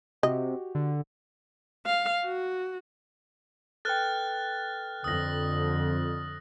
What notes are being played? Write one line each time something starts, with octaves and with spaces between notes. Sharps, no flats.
C3 F#4 G4 D#5
D3
F5
F#4
A4 B4 G5 F6 F#6 A6
F2 D3 D#6 A#6